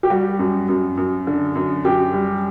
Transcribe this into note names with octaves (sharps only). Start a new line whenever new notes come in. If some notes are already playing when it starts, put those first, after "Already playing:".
G4
G3 F#4
F#2
F#2
F#2
D3
F#2
F#2 G4
G3